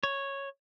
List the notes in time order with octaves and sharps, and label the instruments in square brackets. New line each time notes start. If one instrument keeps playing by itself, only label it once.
[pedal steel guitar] C#5